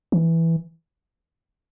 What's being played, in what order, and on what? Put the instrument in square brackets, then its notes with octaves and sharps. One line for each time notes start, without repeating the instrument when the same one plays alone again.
[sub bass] E3